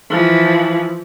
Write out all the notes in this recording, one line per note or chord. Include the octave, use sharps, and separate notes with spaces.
E3 F3